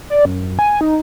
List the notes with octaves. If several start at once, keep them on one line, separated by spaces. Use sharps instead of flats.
D5
F#2
G#5
D#4